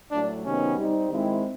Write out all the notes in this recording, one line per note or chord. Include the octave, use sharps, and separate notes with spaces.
A2 F#3 A3 D4
C3 D#3 F#3 B3 C#4 D#4
G3 C4 D#4
D#3 G#3 C4 E4